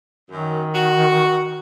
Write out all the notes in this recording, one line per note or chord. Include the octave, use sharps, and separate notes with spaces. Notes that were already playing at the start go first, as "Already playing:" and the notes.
F#2 D#3
F#4